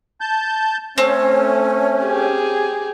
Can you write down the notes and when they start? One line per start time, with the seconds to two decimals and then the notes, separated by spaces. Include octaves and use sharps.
0.21 A5 G6
0.98 A3 C4 C#4 C#5
2.04 G4 G#4